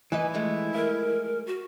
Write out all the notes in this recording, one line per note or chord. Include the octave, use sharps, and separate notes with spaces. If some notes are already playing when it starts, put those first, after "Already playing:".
E3 D#4 E4 B4 G#5
F3 G#3 A3
A#4 E5
F#4